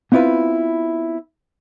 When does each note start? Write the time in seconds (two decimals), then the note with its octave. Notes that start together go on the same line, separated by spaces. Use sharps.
0.12 B3 C4 E4 F4 B4